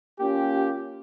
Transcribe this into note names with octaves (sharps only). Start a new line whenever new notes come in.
A#3 C#4 F4 G4